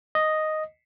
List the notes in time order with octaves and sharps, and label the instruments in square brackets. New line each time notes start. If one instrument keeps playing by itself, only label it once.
[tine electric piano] D#5